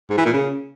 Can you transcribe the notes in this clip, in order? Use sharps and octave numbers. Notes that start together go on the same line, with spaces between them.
G#2
E3
A#2
C#3